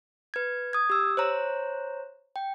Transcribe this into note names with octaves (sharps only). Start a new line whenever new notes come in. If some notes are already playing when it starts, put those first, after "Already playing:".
B4 G#6
D#6 G#6
G4 E6
C5 C#5 A#5
G5